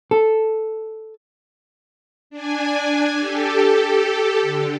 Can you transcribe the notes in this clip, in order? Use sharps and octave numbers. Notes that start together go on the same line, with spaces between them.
A4
D4 G#5
G4 A4
D3